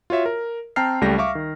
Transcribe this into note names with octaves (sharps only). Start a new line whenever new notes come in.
F4 F#4 C#5 E5
A#4
C4 G5 A5 A#5 F6 C7
C#2 G3 A3 G5 A#6
E5 F5 C#6 D6
D#3